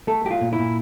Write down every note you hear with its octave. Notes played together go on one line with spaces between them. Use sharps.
A3 A4
A3 G4
F4
A#2
E4
A#2